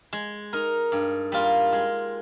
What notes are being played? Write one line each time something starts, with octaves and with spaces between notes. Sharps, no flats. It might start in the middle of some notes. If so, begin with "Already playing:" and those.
G#3
D#4 A#4
G2
G3 A#3 F4
G#3